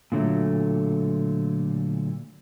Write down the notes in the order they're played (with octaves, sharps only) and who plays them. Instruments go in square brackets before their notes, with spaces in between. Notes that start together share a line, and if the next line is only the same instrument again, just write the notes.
[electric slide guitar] A#2 D3 F#3 A3